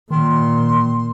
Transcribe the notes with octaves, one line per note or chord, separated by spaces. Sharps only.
A#2 D#3 C6